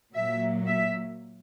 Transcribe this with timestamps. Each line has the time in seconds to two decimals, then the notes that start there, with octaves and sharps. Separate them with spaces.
0.14 A#2 F#3 A#3 E5
0.67 E5